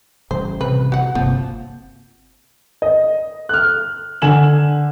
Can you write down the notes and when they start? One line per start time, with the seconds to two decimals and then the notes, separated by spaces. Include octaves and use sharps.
0.31 A1 C#3 G3 C5
0.61 C3 B4
0.92 F#4 F#5
1.15 G1 C3 F3 A#3 C4
2.82 D#5
3.49 F6 F#6
4.22 D3 G#5 E7 F#7